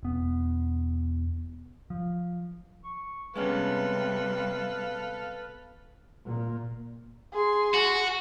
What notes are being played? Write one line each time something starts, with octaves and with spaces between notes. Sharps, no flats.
E1 B3
F3
C#6
C3 G3 G#3 B3 C#4 A4 B4 F5
A#2
G#4 C6
F#4